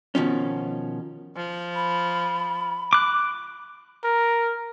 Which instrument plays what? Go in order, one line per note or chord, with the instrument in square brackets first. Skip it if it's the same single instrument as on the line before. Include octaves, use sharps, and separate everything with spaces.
[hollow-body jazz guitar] B2 D#3 F3 C#4
[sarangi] F3
[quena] B5
[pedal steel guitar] D6 F#6
[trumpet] A#4